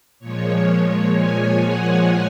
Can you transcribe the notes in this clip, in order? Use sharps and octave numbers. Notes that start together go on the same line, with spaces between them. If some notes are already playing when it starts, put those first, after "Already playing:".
A#2 F3 G#3 C#5
G#5
F#5